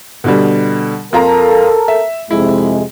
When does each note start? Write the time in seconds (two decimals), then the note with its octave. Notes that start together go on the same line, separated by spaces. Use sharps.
0.24 B2 D3 G3
1.13 F2 F4 A4 A#4 A#5
1.88 E5
2.31 F2 C3 G#3 E4